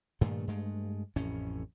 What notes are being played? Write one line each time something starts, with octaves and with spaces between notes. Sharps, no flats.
G2 A#2 D#3 A3
G2 G#3 A3
A1 F2 A2 C#4